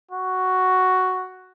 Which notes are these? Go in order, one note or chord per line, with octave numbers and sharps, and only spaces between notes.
F#4